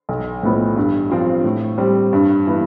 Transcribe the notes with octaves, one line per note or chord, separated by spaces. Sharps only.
B1
A2 F3 B3
G2
F3 C4 F4
A2
G3 C4
G2
E3 B3